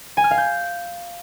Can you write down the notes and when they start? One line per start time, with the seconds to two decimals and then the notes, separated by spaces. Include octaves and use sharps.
0.17 G#5
0.24 F6
0.31 F5
0.38 G6